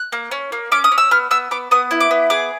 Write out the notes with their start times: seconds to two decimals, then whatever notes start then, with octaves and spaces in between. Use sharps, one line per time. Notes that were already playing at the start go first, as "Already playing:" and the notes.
Already playing: F#6
0.12 A#3
0.31 C#4
0.52 A#3
0.72 C#4 D6
0.84 D#6
0.92 C#4
0.98 E6
1.11 B3 F6
1.31 B3 E6
1.51 B3 D6
1.71 B3 D#6
1.91 E4
2.00 D6
2.11 B3
2.30 G#4 D6